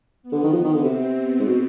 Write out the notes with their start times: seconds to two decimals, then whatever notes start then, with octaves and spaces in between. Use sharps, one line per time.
0.23 B3
0.32 D3
0.43 D#3
0.53 F3 B3
0.64 D#3
0.74 D3
0.84 C3 C4
1.16 B3
1.40 G#2
1.46 B2